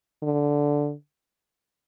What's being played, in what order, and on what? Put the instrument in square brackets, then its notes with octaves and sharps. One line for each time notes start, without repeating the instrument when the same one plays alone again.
[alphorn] D3